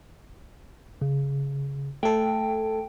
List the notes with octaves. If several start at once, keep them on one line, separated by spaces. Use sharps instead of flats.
C#3
A3 A4 G5